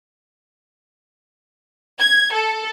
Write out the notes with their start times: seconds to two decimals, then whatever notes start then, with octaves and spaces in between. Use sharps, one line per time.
2.00 G#6
2.34 A4